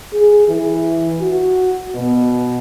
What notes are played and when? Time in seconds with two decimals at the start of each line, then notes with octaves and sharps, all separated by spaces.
0.13 G#4
0.48 E3
1.21 F#4
1.95 B2